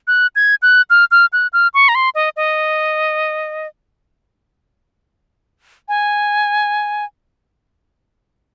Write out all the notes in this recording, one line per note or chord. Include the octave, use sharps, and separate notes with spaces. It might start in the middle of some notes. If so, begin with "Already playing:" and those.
F#6
G#6
F#6
F6
F6
F#6
F6
C#6
A#5
C6
D#5
D#5
G#5